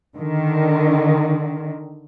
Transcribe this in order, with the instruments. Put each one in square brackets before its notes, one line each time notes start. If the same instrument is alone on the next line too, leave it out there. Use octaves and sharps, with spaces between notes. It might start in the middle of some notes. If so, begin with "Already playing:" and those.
[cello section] D3 D#3